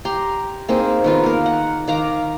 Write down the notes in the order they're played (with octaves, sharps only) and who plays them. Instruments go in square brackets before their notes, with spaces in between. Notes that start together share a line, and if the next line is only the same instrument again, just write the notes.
[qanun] G4 A#5 C6
A#3 C4 D#4 G#4
D#3 B3 F4
A#3 A#4
F#5
D#3 F5 A#5 D6